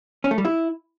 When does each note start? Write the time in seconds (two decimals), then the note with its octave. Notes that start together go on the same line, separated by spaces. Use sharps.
0.24 C#4
0.31 A3
0.38 G3
0.45 E4